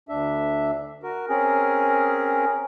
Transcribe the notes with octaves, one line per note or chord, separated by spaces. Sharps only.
D2 D4 E5
F#4 A#4
C4 C#4 G#4 A#4